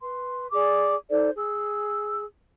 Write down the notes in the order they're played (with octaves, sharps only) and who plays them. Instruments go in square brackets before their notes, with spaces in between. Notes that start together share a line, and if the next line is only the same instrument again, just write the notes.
[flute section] B4 C6
G#4 D5 D6
D#4 A4 C5 D5
G#4 E6